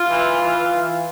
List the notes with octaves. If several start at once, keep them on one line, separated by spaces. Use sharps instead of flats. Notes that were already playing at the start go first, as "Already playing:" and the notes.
Already playing: F4
E3
E3
E3